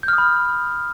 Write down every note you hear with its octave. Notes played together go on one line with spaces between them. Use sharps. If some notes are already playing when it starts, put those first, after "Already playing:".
G6
F6
D#6
B5